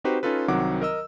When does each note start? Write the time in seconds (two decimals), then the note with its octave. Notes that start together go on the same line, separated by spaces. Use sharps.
0.04 C4 D#4 F#4 G4 B4 C5
0.23 C#4 D#4 F4 A4 B4
0.48 C2 D#3 F#3 C4 F#5 D6
0.82 A#4 D#5 E6